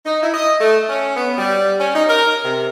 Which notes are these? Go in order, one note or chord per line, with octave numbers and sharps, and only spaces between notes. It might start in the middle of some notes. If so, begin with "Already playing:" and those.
D#4
E4
D#5
A3
C#4
B3
G3
C#4
D#4
A#4
C3